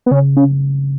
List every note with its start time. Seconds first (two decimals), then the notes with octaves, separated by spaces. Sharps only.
0.06 B3
0.11 C#3 C#4
0.37 C#4